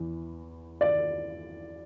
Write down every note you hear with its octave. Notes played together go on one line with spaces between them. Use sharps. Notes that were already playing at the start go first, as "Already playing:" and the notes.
Already playing: E2 E3
D5